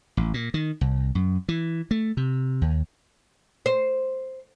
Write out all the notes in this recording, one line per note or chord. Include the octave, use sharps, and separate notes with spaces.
A1
A#2
D#3
C2
F#2
E3
A3
C3
D#2
C5